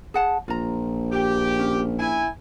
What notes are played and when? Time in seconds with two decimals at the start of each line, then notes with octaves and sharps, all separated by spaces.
0.14 G#4 F#5 A5
0.48 A#1 F4 A#5
1.13 G4
1.59 C#4
1.98 E4 G#5